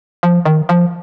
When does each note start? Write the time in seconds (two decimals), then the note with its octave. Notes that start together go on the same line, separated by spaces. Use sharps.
0.23 F3
0.45 D#3
0.69 F3